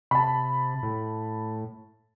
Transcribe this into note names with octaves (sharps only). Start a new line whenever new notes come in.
C3 A5 B5
A2